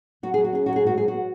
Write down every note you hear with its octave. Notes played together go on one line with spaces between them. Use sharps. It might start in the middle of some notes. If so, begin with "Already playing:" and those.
F#3 F#4
F#3 G#4
F#4
C#4 G#4
F#3 F#4
G#4
G#2 F#4
F#3 G#4
F#4
B3